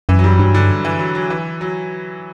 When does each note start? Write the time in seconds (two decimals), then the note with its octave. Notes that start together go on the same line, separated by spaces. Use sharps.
0.09 F#2 E3
0.19 F#3
0.24 G3
0.39 G2 F#3
0.54 D3
0.85 E3
0.99 F#3
1.15 F#3
1.30 E3
1.61 F#3